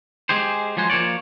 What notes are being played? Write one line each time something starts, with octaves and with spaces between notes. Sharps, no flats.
G#3 G4 G#4 C5
F3 F#3 G#3 G#4 C5
F3 A#3 C#5 D5